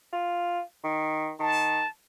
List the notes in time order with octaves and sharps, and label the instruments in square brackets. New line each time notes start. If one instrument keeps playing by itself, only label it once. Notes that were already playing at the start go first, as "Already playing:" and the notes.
[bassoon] F4
D#3
[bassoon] D#3 [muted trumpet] A5